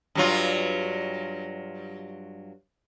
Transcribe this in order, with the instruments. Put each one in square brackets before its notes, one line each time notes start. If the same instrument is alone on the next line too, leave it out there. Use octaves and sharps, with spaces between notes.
[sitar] G2 F#3 F4